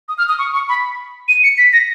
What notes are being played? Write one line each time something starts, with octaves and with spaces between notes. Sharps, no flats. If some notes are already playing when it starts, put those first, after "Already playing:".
D#6
F6
D#6
C#6
C#6
B5
D#7
C#7
B6
A#6